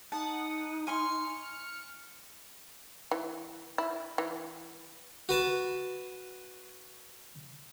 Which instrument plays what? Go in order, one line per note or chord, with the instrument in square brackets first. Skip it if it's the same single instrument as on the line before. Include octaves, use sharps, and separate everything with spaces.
[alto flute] D#4 [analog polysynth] F#5 D#6 [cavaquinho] A5
[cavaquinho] G#5 C6 C#6 [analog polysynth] F6 C#7
[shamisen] E3
E4
E3
[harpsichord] F#4 B4 A5